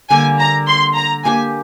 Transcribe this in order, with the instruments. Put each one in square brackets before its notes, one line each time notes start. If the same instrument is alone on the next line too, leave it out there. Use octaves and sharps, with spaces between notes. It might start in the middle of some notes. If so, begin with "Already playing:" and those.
[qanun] D3 G3 A#3 D4 [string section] G#5
[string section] A#5
C6
A#5
[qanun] A#3 D4 G4 [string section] G#5